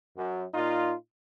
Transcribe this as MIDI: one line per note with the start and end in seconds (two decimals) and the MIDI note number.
0.17 0.45 42
0.54 0.94 46
0.54 0.94 63
0.54 0.94 65